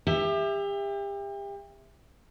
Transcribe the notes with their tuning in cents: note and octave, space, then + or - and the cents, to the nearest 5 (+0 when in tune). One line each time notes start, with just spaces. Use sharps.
G4 +35 E5 +0